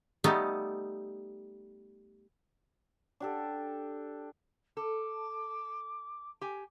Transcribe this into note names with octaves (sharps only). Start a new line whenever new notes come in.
G3 A3 B3 D#4
D4 G4 A4
A4 D6
G4 G#5